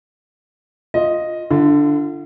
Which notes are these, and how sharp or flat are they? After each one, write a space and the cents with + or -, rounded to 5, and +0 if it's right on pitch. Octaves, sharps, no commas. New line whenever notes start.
F4 +0 D#5 +0
D3 +0 F4 -45